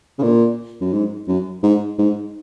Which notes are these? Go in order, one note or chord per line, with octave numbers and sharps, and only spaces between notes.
C#3
A#2
F#2
G#2
F#2
G#2
G#2